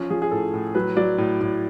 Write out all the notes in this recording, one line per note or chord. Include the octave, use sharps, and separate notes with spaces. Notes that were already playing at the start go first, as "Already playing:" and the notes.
Already playing: F3 C#4
F3 G#4
G#4
A2 A4
A2
F#3 B4
F#3 D5
A2
A2